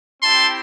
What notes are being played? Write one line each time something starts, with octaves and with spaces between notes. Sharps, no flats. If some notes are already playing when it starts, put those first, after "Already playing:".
C4 E4 G4 A5 C6